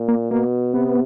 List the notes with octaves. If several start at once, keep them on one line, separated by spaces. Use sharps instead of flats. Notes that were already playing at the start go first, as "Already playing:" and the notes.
Already playing: A#2
A#3
B2 A#3
C3 B3